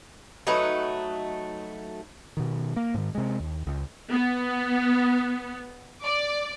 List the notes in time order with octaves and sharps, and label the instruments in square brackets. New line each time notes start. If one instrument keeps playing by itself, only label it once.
[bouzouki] F#3 A3 D#4 B4
[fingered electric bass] B2 D#3
A#3
G#2 D#3
C3 G#3
D#2
C#2
[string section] B3
D5